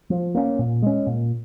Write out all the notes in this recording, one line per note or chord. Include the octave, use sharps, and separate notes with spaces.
F3
A#3 C#4
A#2
G#3 C#4
A#2